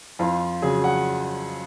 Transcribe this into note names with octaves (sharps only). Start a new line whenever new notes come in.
F2 F4
C#3 F#3 G#4
F#5